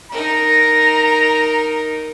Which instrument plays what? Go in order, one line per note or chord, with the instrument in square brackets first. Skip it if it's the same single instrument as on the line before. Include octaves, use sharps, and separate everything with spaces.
[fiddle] D#4 A#4 [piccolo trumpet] A#5